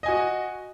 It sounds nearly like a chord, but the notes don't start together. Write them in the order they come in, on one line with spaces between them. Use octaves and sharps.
D#5 G#5 F#4